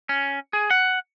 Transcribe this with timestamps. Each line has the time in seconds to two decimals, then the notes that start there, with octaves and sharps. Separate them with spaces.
0.09 C#4
0.53 G#4
0.70 F#5